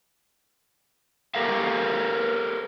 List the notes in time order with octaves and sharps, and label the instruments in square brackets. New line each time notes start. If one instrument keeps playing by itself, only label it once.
[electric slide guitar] G4 A4 A#4 E5 F5